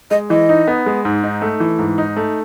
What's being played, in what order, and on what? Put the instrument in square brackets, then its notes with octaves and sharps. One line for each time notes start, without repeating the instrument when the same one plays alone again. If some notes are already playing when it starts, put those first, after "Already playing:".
[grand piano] G#3 [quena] D#5
[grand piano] E3 [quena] D#5
[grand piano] D#4
B3
G#3
G#2
D#4
A3
E3
G#2
D#4
A3